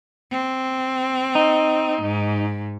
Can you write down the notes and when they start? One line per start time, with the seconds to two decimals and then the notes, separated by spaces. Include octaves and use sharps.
0.32 C4
1.35 D#4
2.02 G#2